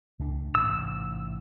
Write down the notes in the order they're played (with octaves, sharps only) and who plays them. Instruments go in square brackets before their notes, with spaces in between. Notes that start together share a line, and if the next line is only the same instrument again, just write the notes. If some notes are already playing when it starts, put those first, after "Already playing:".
[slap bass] C#2 A3 D4
[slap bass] A1 G#2 C3 [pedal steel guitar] E6